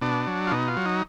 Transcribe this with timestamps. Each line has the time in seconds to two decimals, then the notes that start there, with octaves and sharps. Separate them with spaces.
0.01 B2 D4
0.27 F#3
0.47 F4
0.51 B2 D#4
0.68 F4
0.77 F#3
0.86 D#4